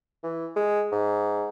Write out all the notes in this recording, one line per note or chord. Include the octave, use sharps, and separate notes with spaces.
E3
G#3
G#2